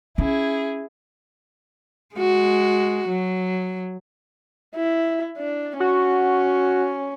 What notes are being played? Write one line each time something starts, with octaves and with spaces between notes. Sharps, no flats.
C#4 E4 G#4
G#3 F#4
F#3
E4
D4
C#4 F#4